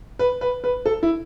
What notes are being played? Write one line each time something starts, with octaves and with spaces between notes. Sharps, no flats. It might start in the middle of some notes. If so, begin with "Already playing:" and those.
B4
B4
B4
A4
E4